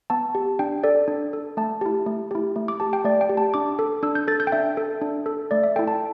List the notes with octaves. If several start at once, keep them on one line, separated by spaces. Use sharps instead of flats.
B3 A5
G4
D4 G5
A4 D5
D4
A4
A3 A5
E4 G4
A3
E4 G4
A3
D6
G4 A5
G5
A3 D5
G5
G4
A5
D4 D6
A4
D4 E6
G6
A4 A6
G6
G5
D4 E5
A4
D4
A4
A3 D5
E5
E4 A4 G5
A5